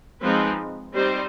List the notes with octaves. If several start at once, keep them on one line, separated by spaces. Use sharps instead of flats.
F3 G#3 C4 D#4 B4
G3 C4 D#4 C5